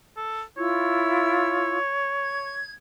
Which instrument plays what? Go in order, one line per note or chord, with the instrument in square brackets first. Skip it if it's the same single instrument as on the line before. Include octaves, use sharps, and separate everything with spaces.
[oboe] A4
[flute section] E4 F4 E6 [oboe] C#5
[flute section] G#6